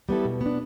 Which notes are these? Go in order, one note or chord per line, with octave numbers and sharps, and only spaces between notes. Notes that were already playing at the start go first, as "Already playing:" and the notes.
G3 B3 E4 A4
B2
B3 D4